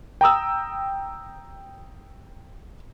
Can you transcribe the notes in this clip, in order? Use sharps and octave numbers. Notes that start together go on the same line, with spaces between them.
G5 A#5 D#6 E6